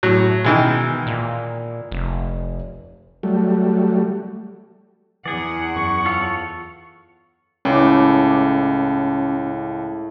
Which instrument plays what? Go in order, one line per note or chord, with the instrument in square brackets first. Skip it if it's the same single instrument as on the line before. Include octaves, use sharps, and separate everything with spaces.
[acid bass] A2 [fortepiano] F#3
[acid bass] B2 [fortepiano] D#3 E3 G#3
[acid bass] A#2
F1
[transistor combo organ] F#3 G3 A3
[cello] E2 F#5 [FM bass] E3 [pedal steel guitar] G#4 D5
[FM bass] F#2 [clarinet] C#6
[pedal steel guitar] F4 A4 C#5
[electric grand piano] C#2 [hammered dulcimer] A2 D6 [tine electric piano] C#4